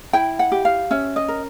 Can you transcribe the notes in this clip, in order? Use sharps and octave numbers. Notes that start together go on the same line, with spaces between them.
E4 G5
F#5
G4
F5
C#4 E5
D#5
A#4